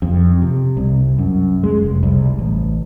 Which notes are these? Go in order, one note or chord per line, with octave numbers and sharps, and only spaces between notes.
F2
C3
C2
F#2
G#3
F1
C2
A1